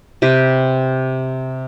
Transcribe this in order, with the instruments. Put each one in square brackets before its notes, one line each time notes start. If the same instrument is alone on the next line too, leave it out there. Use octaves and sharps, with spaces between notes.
[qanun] C3 G4 B4